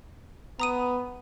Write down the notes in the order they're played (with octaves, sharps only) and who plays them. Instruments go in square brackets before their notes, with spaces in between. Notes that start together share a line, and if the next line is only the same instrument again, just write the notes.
[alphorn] B3 [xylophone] A#5 D#6 D#7